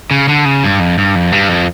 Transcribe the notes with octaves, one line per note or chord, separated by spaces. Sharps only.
C#3
D3
C#3
G2
F2
G2
F2
G2
F2